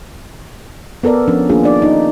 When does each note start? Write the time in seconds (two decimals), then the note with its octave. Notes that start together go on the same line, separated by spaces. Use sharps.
1.03 B3 A4 A#4 D5
1.28 F3 C#4 D4
1.49 D#3 A#3 D4 F4 G#4
1.64 D4 D#4 D5
1.82 D#4